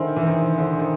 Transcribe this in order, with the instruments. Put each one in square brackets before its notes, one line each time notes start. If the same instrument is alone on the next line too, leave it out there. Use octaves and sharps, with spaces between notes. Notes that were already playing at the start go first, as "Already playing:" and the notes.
Already playing: [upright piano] D3 D#3 [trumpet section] E4 G#4 C5
[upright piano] E3
D#3
D3
D#3